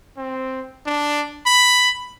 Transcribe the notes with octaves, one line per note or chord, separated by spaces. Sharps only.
C4
D4
B5